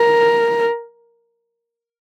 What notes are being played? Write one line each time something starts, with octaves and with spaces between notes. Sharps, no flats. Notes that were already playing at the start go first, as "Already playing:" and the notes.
Already playing: A#4